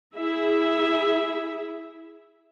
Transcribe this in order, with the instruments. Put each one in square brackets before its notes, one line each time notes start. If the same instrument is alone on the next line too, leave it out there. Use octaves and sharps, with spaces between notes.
[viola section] E4 G#4 E5